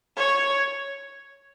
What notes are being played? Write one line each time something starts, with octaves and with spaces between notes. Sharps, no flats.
C#5